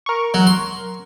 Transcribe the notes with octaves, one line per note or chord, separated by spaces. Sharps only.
A#4 C#6
F#3
C6